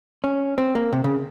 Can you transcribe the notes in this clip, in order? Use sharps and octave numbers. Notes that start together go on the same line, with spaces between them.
C#4
C4
A#3
C3
C#3